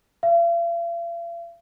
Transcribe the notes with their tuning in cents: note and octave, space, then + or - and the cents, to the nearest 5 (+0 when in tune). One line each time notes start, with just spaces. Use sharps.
F5 -45